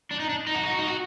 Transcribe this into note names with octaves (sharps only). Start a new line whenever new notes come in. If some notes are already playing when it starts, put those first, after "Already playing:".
D4
D#4
D4
D#4
F#4
D#4
F#4
D#4
F#4